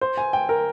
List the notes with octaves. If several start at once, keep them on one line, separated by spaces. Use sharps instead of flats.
C5
G#5
G5
A#4